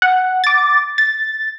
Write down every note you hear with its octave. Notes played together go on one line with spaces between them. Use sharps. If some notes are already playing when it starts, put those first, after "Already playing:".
F#5
D6 A6
A6